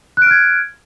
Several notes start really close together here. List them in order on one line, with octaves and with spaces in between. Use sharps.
F#6 D7 F6 G#6